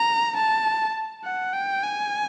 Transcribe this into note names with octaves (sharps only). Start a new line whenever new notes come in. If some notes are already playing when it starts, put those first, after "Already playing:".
Already playing: A#5
A5
F#5
G5
G#5